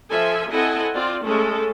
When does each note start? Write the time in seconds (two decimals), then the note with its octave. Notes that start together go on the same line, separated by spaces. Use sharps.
0.11 F3 A4 E5 G#5
0.50 C4 E4 A4 D#5 F#5 G#5
0.94 C4 F4 D5
1.24 G#3 A3 C#4 A4